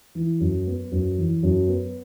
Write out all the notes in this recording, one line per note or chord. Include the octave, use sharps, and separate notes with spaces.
E3
F#2
B3
F#2
E3
F#2
B3